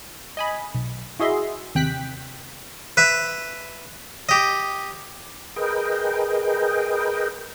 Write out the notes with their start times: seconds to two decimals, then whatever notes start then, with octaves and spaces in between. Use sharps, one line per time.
0.37 D#5 G#5 B5
0.74 B1
1.20 E4 F#4 G#4 D#5 E5 C6
1.75 D#2 C3 G5 F#6 B6
2.97 B4 E5
4.29 G4 D#5
5.56 G#4 A#4 B4 D#5 G5